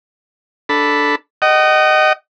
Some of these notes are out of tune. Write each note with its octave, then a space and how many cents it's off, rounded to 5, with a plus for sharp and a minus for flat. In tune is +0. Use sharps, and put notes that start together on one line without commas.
D4 +0 A4 +0 B5 +0
D#5 -10 F#5 +45